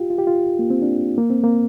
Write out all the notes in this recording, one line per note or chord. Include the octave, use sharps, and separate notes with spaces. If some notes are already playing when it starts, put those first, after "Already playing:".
Already playing: F4 G4
F4
G4
F4
A#3
C4
D4
A#3
C4
A#3